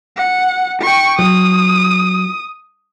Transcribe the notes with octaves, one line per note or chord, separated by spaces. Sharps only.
F#5
G5 C#6
F#3 D#6